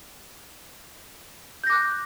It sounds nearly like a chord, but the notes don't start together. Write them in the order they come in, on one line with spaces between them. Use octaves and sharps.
G6 A#6 D6 F#6